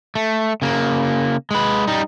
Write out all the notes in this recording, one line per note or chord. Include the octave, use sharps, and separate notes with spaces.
A3
C#3 A#3
G#3 B4
G3 D#4